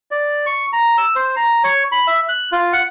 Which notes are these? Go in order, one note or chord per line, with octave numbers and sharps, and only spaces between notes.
D5
C#6
A#5
E6
C5
A#5
C#5
B5
E5
F#6
F4
F#5